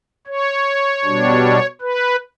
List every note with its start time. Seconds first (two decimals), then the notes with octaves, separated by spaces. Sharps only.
0.27 C#5
1.04 B2 G3 D4
1.81 B4